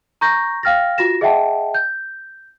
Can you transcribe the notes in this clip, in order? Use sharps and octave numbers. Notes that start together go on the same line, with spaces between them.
A#5 C#6 G6 A#6
F5 G5 F6 A6 A#6
F4 F#4 A6 A#6 E7
G#4 D#5 E5 F#5 G5 A5
G6